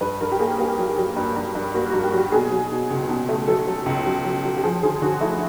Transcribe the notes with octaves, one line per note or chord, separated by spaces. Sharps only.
G2 B4
G2 A#4
G4
A#3 G#4
A#3 G4
F#3
F#3
G2
G2
G2
A#3 F#4
F#4
G2
G4
F#3 G4
B2 G#4
F#3
B2
C#2
B2
A3
F#3 A4
F#3
C#2
F#3
F#3
F#3
G4
F3 G#4
D3 G#4
D3 F#4
A3 E4